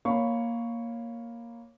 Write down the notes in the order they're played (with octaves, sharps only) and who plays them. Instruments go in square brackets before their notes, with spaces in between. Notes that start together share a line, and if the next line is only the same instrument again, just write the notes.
[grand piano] A#3 C#5 F5 B5 C#6